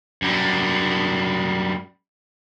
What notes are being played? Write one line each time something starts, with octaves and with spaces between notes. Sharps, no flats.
F#2 G3